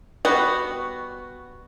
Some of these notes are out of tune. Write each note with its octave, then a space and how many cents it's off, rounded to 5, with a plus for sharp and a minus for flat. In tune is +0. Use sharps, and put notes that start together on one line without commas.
G3 +0 B3 +0 F#4 +0